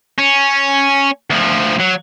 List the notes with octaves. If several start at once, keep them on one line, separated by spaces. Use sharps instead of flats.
C#4
D2 F3
F#3